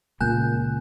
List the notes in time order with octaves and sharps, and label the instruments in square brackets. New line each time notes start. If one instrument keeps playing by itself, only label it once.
[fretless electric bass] C#2 A#2 A#3 [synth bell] G#5 F#6 G6